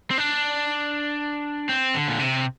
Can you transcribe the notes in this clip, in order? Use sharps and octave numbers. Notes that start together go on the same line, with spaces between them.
C4
D4
C4
D3
A#2
C3